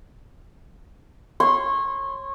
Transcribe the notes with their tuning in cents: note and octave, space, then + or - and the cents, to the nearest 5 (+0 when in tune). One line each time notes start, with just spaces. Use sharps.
C#5 -25 C6 -10